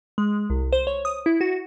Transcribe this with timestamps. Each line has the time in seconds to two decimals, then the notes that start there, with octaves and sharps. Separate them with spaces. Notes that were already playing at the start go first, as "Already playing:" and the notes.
0.18 G#3
0.50 C2
0.73 C5
0.87 C#5
1.05 D#6
1.26 E4
1.41 F#4